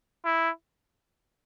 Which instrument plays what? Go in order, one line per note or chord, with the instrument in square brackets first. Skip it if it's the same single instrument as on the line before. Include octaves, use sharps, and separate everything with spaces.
[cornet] E4